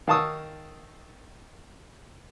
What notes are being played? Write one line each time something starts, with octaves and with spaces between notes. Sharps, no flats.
D#3 F5 A5 C#6 D#6 E6